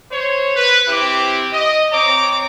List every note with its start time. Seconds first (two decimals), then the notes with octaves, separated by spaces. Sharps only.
0.10 C5 C#5
0.56 B4
0.88 C4 E4 G4 D6
1.52 D#5
1.92 C4 C#5 A#5 D6